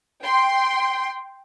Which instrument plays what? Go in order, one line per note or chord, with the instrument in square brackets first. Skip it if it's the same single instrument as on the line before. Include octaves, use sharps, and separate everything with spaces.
[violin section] G5 C6